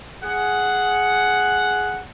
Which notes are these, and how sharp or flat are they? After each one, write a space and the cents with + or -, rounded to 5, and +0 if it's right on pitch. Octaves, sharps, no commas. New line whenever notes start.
G#4 +10 F#5 +0